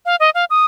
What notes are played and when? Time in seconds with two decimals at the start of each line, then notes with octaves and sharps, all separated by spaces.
0.06 F5
0.20 D#5
0.35 F5
0.50 D#6